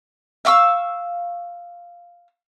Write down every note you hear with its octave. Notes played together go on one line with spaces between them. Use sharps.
E5 F5 C#6 E6